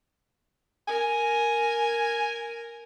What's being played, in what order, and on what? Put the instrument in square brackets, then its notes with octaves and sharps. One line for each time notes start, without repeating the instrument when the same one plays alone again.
[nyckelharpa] A#4 [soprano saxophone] G#5